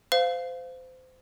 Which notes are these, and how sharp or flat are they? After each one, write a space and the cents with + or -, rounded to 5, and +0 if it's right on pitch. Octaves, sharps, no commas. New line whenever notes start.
C5 -25 F5 +0